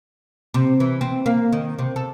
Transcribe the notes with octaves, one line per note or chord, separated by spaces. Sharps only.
C3
E3
C4
A#3
D#3
C3
A4